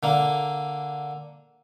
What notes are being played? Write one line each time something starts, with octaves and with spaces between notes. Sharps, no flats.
D3 A#3